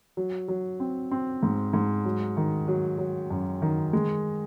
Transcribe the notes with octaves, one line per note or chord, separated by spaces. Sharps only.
F#3
F#3
C4
C4
G#2
G#2
F#3
D#3
F#3
F#3
F#2
D#3
G#3